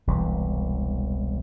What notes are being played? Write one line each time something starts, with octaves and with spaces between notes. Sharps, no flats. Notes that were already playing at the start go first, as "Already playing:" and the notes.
E1 C2 E3